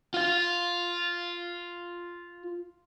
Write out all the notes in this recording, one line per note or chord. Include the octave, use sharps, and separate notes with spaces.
F4 F5